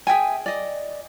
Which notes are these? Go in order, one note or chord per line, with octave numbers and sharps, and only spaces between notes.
G#4 E5 G5 G#5
D5 D#5